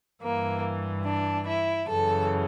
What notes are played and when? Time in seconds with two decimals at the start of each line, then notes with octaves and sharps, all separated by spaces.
0.22 G2 E3 A#3
1.05 D4
1.47 E4
1.88 F#2 C#3 E3 A4